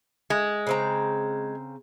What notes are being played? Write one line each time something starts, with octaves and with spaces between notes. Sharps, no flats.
G#3
C#3 C4 A#5